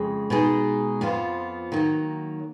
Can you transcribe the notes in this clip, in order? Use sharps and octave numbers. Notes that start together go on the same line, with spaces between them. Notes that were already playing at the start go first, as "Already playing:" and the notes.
Already playing: F2 C#3 G#3
B2 G#3 D#4 G#4
F2 F3 B3 F4
D#3 F#3 A#3